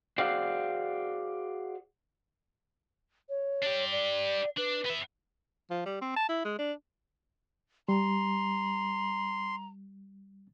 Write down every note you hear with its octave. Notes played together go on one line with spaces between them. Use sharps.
F#4 G#4 C5 D5 F5 G5
C#5
D4 G4
D5
D4 B4
B3 E5
F3
G3
C4
A5
E4
G#3
D4
G3 A#5 C6